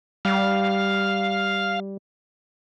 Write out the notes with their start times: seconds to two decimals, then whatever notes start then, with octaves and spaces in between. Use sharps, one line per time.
0.25 G3 F5